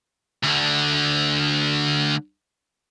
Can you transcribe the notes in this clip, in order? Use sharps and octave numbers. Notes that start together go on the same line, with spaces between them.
D2 D3